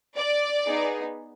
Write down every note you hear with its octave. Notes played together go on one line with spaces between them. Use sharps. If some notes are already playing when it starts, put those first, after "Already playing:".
D5
B3 D#4 G#4